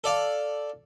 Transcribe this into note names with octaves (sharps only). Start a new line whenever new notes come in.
A4 D5 F5